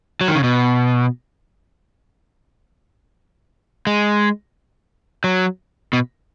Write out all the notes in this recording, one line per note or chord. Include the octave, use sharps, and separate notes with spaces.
F#3
D#3
C#3
B2
G#3
F#3
B2